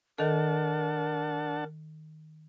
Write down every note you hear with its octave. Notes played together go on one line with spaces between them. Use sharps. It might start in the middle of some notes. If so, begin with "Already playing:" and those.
D#3 D4 A4 A#4 F#5 A5